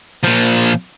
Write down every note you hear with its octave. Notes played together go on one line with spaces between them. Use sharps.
A#2 F3